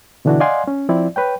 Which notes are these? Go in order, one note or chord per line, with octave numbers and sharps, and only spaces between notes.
B2 D3 E3 D4 E4 F#4
D5 D#5 F5 F#5 G#5 C6
C#4
F3 C4 E4 D5
B4 C#5 G5